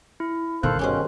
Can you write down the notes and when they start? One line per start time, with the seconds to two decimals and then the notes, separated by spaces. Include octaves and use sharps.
0.20 E4
0.63 G1 B2 D#3 B3 A4 C5 F5 F#6
0.79 G2 B2 D#3 C#4 G4 G#4 C5